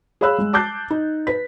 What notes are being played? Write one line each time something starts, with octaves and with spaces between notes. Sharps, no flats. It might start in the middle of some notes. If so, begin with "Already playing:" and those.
G#4 C#5 F5 B5 E6 F#6
G#3
A5 D6 F#6 G6 A6 C7
D#4
B4 B6